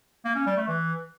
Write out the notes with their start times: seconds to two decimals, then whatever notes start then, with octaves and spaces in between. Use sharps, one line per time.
0.25 A#3
0.36 C#4
0.46 G3
0.57 A3
0.68 E3